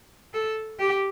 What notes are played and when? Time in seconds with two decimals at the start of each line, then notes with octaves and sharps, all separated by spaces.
0.34 A4
0.79 G4